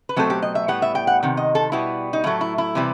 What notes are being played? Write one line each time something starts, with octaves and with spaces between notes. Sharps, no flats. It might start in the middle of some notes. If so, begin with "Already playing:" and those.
B4
B2 F#3 A3 C4 A4
G4
D#5
E5
A2 G3 B3 F#5
E5
G5
F#5
C3 D#3
D#5
A4
B2 G3 B3 E4
D#4
A2 F#3 A3 E4
E4
E4
C3 E3 G3